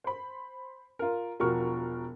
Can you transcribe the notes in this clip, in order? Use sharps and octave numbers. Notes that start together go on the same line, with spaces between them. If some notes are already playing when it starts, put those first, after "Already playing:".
C5 B5
F4 A#4
E1 F3 F#4 A#4 C#6 F6